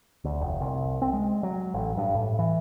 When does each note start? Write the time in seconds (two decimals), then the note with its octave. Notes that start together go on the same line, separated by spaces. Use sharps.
0.24 D2
0.41 F1
0.61 C2
1.02 C4
1.13 G#3
1.43 F#3
1.74 A1
1.97 G2
2.15 A2
2.39 E3